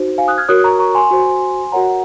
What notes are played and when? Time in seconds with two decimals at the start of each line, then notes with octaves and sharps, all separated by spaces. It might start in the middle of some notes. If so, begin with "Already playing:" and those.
Already playing: D#4 F#4 C5
0.18 F5 G#5
0.28 D#6 F#6
0.38 F6 G#6
0.49 F#4 A#4 C#5 D#6 F#6
0.64 A#5 C#6
0.79 A#5 C#6
0.95 G#5 C6
1.11 F#4 C5
1.72 F#4 A#4 C#5 F#5 A#5